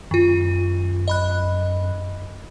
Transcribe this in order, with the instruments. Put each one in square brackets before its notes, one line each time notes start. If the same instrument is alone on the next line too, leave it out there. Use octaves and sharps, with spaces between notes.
[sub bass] F#2 [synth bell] D#3 F4
[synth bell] D#5 B5 F#6